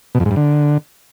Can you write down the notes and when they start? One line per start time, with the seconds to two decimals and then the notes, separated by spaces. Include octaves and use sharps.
0.15 B2
0.20 F2
0.25 G#2
0.31 G2
0.36 D3